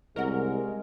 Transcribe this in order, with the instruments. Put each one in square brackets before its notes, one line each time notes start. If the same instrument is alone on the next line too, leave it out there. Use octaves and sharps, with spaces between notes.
[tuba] C2 [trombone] G#3 [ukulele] C#4 D#5 F#5 [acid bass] A#4